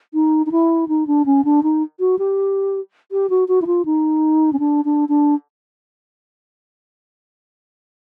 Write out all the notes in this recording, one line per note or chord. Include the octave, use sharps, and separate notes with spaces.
D#4
D#4
E4
D#4
D4
C#4
D4
D#4
F#4
G4
G4
F#4
F#4
E4
F4
D#4
C#4
D4
D4
D4